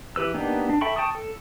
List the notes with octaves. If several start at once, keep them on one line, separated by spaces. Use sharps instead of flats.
E3 G4 B4 E6
A#3 B3 D4 D#4 G4
D4
A4 E5 G5 B5 C#6
G5 A5 C#6 D#6
A4